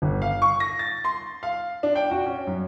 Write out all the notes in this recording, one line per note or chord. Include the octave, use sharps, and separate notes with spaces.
G1
F5
C#6
A#6
A6
C6
F5
D4
G5
F#4
C#4
F#2